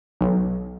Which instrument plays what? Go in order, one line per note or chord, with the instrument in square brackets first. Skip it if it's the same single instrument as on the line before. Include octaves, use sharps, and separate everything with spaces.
[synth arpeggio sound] B1